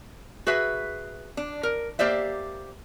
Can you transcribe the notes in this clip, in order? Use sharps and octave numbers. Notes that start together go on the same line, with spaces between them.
F#4 G#4 B4 E5
D4
A#4
A#3 G4 C5 D5 E5